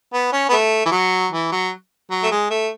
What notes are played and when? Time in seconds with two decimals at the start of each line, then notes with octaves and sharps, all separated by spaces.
0.13 B3
0.32 C#4
0.49 B3
0.52 A3
0.86 E3
0.91 F#3
1.32 E3
1.52 F#3
2.10 F#3
2.23 A3
2.31 G#3
2.50 A3